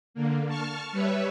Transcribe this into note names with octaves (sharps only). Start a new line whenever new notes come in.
D3 A#3
A5 C#6 F6
G3 B4 C#5 E5